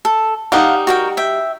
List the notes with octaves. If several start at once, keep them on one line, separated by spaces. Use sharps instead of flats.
A4
G3 D#4 F5 F#5
F#4 A#4 G5
E5 G5